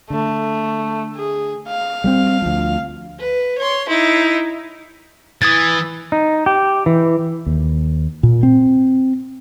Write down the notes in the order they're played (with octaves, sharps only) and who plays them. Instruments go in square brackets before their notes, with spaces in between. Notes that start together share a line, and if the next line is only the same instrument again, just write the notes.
[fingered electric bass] D3 [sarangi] A3
[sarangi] G#4
F5
[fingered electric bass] G3 A3 C4
D2 F3
[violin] B4
C#5 C6
D#4 E4
[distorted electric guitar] E3 [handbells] D#6 G#6 A6
[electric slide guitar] D#4
G4
E3
[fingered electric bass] D#2
A#2
C4